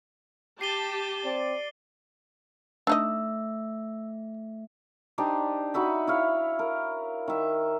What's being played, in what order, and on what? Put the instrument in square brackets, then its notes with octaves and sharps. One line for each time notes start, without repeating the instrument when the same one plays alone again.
[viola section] G4 A5 [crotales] C7 D#7 G7
[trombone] C4 [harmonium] D5
[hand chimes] A3 E5 [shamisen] D4 D#4 D#5 [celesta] E6
[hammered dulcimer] D4 D#4 G4 C5
D#4 F#4 E5 B5
E4 C#5 F5
A#4
D#3 E5